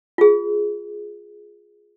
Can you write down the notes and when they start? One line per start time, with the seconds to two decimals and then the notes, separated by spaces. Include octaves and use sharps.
0.18 F4 G#4